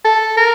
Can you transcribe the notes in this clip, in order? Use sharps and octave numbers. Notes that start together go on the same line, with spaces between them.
A4
A#4